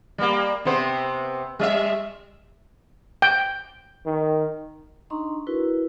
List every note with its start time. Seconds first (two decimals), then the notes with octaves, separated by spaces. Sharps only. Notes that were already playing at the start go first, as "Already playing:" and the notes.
0.18 G3 A#3
0.65 C3 B3 C5
1.59 G3 D#5 E5
3.22 G5
4.06 D#3
5.10 D4 D#4 D#5 A#5 C6 C#6
5.47 E4 F#4 A#4 B4